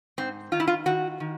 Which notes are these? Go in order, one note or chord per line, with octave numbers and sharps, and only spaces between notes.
G#2 C4
D#3 F4
E4
F4
D#3 F#4
D#3